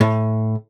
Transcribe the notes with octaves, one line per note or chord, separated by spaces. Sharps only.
A2